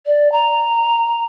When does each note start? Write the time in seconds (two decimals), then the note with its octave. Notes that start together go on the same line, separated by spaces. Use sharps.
0.06 D5
0.32 A#5